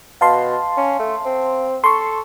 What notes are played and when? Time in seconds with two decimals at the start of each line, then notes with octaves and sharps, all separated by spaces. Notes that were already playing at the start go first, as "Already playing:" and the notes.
0.21 B2 F5 A5 C6
0.77 C#4
0.99 A3
1.26 C4
1.84 A4 C6 C#6